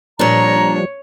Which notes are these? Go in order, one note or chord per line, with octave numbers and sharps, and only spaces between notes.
A#2 F3 G3 D4 C#5 A#5